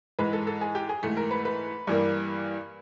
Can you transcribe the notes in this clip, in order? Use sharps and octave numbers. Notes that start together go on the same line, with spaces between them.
G#2 E3 G#3 B4
A4
A4
G#4
G4
G#4
G#2 E3 A3
A#4
B4
B4
G2 E3 G3 A#3